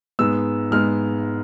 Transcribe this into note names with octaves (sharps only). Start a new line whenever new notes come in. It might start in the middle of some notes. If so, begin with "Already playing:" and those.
G#2 G#3 B3 E6
G#2 G#3 B3 F6